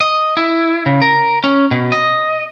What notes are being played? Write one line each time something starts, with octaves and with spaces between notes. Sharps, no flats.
D#5
E4
C#3
A#4
C#4
B2
D#5